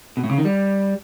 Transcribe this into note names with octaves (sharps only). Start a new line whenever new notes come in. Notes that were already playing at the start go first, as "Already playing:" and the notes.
B2
A2
C#3
D#3
G3